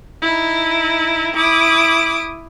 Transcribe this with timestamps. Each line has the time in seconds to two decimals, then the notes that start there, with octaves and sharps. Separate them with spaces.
0.22 D#4 E4
1.36 E4 D6 D#6